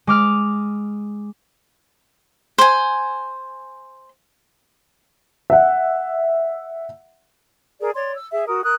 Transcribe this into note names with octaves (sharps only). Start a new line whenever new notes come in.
G#3 D6 F6
C5 G#5
E5 F#5
G#4 A#4 D5
C#5 D5 C6
E6
G#4 E5
F#4 A#4 D#6
A#4 D#6 F#6